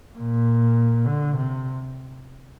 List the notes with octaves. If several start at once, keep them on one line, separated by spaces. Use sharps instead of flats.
A#2
D3
C3